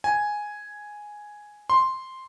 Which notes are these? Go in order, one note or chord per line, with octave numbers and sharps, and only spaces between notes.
G#5
C6